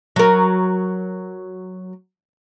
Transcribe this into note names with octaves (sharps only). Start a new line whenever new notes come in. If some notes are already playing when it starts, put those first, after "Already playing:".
F#3 A#4